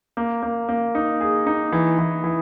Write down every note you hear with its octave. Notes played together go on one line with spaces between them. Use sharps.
A#3
A#3
A#3
D#4
G#4
D#4
E3
E3
E3